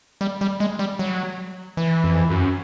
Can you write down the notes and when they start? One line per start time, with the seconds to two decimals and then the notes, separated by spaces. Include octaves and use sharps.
0.21 G3
0.41 G3
0.60 G#3
0.79 G3
0.99 F#3
1.77 E3
2.04 F2
2.30 F#2